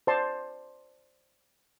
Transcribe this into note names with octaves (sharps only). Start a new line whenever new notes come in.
C5 D5 A5 C6